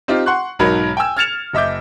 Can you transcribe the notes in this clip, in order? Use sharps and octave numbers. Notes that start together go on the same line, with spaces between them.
C4 D#4 F4 G4
F#5 C6 C#6 F#6
B1 G#2 F#3 D#4 A#4 B5
G5 G#5 E6
F6 G#6 A6 C#7 E7 F7
F#1 D#5 E5 D6 G6